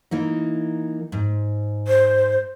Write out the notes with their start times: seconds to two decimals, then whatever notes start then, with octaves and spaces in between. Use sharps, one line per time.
0.11 E3 A#3 D#4
1.12 G#2
1.88 C5